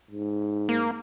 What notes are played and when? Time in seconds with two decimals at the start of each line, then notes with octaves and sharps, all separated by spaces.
0.11 G#2
0.69 A#3